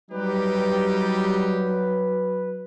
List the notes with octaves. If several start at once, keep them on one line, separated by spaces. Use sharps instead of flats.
F#3 G3 D#4 G4 B4